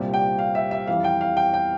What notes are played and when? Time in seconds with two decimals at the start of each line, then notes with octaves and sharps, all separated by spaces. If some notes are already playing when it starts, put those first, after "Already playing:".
Already playing: C2 A#2 G3 C4
0.14 G5
0.38 F5
0.55 E5
0.71 E5
0.87 F2 E3 G3 F5
1.04 G5
1.21 F5
1.37 G5
1.54 G5